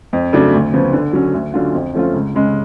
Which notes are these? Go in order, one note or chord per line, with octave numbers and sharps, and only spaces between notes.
F2
C#3 F#3 A3 D4
D2
C#3 F3 B3
D3
F#3 C#4
D2
D3 F#3 C#4 F4
F2
F3 A3 C#4 F4
C#2
C#3 G#3 C#4